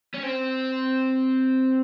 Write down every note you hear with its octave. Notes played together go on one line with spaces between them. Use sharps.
C#4
C4